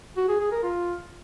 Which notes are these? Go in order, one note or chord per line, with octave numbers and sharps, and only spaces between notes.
F#4
G#4
G#4
A#4
F4